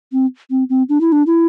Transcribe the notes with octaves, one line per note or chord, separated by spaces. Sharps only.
C4
C4
C4
D4
E4
D4
E4